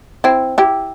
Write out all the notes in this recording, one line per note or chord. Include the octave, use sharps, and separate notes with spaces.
C4 E4
E4 G4